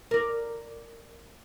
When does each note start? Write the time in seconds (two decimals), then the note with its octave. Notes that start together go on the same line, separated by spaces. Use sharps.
0.11 A#4 D5